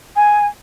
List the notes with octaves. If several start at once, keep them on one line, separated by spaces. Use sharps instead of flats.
G#5